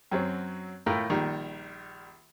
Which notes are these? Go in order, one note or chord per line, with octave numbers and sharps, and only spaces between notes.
F#2 F#3 C4
A2 A3 F4 A#4 G5 E6
A#1 D#3 G3